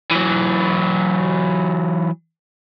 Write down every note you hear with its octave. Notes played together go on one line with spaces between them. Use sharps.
E3 F#3